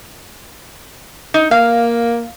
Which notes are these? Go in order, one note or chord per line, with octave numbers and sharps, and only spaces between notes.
D#4
A#3 F5